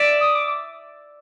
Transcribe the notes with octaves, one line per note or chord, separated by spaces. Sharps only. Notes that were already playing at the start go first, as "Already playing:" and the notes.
Already playing: D5 E5
D#6
D6